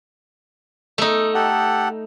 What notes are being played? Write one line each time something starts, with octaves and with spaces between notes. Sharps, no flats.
A3 D#4
G4 A4 F#5